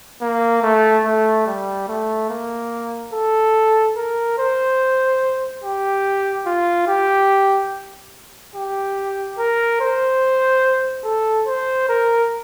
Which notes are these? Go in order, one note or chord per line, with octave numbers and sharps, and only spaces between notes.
A#3
A3
A3
G3
A3
A#3
A4
A#4
C5
G4
F4
G4
G4
A#4
C5
A4
C5
A#4